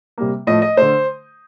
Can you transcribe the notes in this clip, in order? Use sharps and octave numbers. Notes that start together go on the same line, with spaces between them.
C3 G3 A#3
A2 F3 A3 D#5
D#5
D3 A3 C5